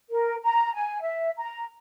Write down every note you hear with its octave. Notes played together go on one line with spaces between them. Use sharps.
A#4
A#5
G#5
E5
A#5